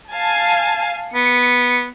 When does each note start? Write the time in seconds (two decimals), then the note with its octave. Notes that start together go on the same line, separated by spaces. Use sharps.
0.12 F5 G#5 A5
1.14 B3 C#7